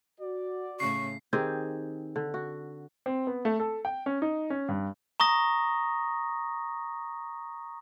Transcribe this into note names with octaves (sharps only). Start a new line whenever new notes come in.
F#4 D5
A2 C#3 C#6 C7
D#3 C4 G4 G#4
D3
F#4
C4
B3
A3
A4
G5
C#4
D#4
C#4
G2
A#5 C#6 D#6 A#6